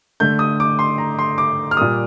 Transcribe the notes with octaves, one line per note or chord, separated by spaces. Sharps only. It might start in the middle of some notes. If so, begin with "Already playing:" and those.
D3 A3 G6
D#6
D6
C6
A#5
C6
D6
F6
A#2 G3 A#3 D#6